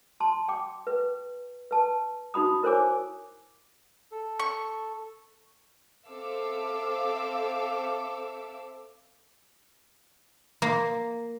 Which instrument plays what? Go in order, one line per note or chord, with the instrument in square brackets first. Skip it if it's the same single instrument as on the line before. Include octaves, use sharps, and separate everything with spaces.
[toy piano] A5 C6
G5 D6
B4
B4 A5
D#4 F#4 B5 D#6
E4 A#4 C5 C#5 G#5 D6
[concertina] A4
[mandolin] C#6
[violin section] C4 A4 E5 F5 D6 E6
[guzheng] A#3